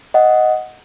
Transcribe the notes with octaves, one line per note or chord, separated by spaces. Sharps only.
D#5 F#5